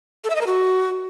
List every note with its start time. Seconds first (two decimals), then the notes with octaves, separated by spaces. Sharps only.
0.24 A4
0.30 E5
0.36 D#5
0.41 A#4
0.47 F#4